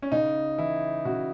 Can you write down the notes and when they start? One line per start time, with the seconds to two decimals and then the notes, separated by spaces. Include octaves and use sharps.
0.02 C#4
0.12 C#3 D#4
0.58 E3 E4
1.05 C#3 F#4